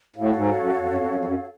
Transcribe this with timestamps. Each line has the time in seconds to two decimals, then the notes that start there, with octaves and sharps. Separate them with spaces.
0.16 A2 F#4 A4 C#5 F5
0.36 G#2
0.56 F#2
0.77 F2
0.86 F#2
0.96 F2
1.06 F#2
1.15 F2
1.25 F#2